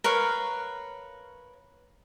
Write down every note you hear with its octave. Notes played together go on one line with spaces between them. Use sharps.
A#4 B4 C#5 F5